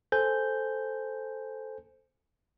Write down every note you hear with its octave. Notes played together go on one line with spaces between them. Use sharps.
A4 C5 G#5 G6